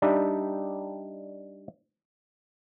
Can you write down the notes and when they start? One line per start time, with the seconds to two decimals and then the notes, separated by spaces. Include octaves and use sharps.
0.02 G3 D4 D#4 G4 D5 E5